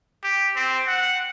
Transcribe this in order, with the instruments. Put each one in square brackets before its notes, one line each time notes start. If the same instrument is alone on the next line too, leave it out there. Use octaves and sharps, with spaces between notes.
[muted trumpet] G4
C4
F#5